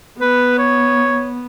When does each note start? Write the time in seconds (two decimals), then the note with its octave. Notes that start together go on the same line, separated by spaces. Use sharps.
0.20 B3 B4
0.58 C#5